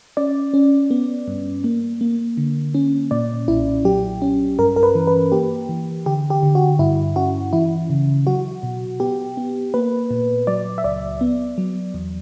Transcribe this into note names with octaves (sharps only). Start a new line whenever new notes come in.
C#4 D5
C#4
B3
G2
A#3
A#3
D3
C#4
A#2 D5
B1 E4
F#3 G4
C#4
G2 A#4
A#4
B4
E3
B4
A#3 G4
E3
D3 G4
G4
D3
F#4
G2 E4
C#4 F#4
E3 E4
C#3
F#3 F#4
B2
B3 G4
B3
A#3 B4
A#2
F#3 D5
E5
C#2 D5
B3
F#3
E2